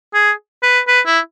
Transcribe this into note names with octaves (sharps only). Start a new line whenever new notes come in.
G#4
B4
B4
E4